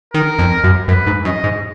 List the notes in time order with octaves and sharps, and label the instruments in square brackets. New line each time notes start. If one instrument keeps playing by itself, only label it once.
[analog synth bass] D#3 [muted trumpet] A#4
[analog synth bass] F2
F#2
[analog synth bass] F#2 [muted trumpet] B4
[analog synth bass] G#2
[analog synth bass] F#2 [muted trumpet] D#5
[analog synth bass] G#2